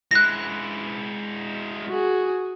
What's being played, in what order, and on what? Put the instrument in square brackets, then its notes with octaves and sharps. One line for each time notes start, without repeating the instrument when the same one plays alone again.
[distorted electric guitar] G#3 E4 [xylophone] F#6 A#6
[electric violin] F#4 G#4